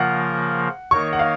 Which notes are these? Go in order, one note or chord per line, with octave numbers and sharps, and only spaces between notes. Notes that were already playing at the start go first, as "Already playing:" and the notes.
Already playing: C#3 F3 A#3 F4 A#4 F#5
D#3 A#3 D#4 A#4 C#5 C#6
F#5
F5